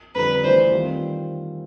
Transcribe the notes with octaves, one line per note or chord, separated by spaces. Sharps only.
F2 D3 G3 B4
E3 A3 D4 C5
D#3 G3 C4 F4